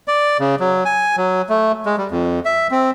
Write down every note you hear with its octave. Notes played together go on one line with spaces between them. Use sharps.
D5
C#3
F#3
G#5
F#3
A3
G#3
G3
F2
E5
C4